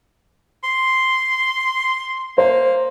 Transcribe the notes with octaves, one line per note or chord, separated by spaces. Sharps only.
C6
A#3 C5